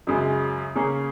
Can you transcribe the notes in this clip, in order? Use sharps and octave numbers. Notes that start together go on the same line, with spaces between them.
F#2 C#3 G#3
C#3 A#3 C#4 G#4